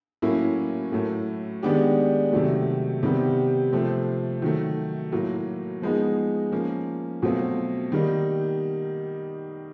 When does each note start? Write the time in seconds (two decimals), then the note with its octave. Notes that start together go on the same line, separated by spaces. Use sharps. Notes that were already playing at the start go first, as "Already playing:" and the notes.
0.22 A2 F#3 A#3 C#4 E4
0.92 A2 F#3 A3
1.62 D#3 G#3 B3 D4 G4
2.32 C3 D#3 F#3 A3
3.03 C3 D#3 G3 B3
3.72 C3 F3 A3 C4
4.42 D#3 F#3 A3
5.12 A2 F#3 A#3
5.82 F3 G#3 B3 D#4
6.52 F3 A#3 C#4
7.22 B2 F#3 A3 C4 F4
7.92 D#3 G3 A#3 D#4